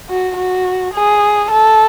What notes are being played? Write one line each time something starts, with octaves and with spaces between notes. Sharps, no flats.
F#4
F#4
G#4
A4